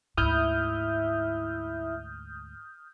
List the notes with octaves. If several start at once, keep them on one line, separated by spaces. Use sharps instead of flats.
D2 G#2 E4 D#6 F6 G6